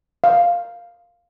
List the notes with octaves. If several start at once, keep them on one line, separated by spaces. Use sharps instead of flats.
F5